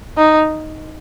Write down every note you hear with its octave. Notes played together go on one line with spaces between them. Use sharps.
D#4